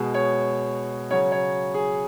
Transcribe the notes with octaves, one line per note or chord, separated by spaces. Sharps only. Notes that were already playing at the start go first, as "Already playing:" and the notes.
Already playing: B2 G#3
C#5
C#3 F#3 C#5
C#5
G#4